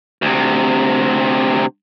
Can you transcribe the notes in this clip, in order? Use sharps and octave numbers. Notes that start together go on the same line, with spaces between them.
D2 C3